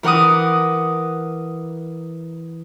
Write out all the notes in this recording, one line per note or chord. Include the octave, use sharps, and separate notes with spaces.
E3 A#4 F#5 D6 D#6